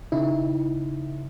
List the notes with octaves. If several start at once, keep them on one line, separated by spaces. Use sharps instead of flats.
C#3 D#4 E4